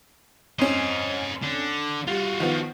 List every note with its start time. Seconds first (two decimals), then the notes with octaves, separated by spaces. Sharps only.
0.59 F2 C#4 C5 D#5
1.42 D3
2.08 G3 F4 F#4
2.40 D#3 F3 B3